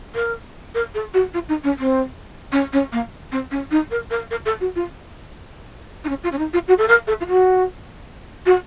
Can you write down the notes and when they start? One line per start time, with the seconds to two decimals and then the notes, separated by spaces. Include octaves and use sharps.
0.15 A#4
0.75 A#4
0.94 A4
1.14 F#4
1.34 F4
1.49 D#4
1.64 C#4
1.79 C4
2.52 C#4
2.73 C#4
2.92 A#3
3.32 C4
3.51 C#4
3.71 D#4
3.91 A#4
4.11 A#4
4.31 A#4
4.46 A4
4.61 F#4
4.75 F4
6.04 D#4
6.09 C#4
6.23 F4
6.32 C#4
6.38 D#4
6.53 F4
6.68 F#4
6.78 A4
6.88 A#4
7.07 A4
7.21 F4
7.27 F#4
8.46 F#4